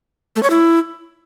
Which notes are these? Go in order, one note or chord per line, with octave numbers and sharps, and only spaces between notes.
A3
C#5
E4